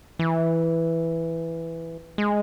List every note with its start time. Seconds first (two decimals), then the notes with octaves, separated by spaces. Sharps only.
0.19 E3
2.18 G#3